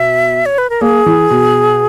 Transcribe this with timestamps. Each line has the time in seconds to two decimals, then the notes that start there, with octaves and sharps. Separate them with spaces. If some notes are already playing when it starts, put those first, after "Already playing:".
Already playing: B2 E5
0.46 C#5
0.58 B4
0.70 A#4
0.81 A#3 G#4
1.06 E3
1.30 B2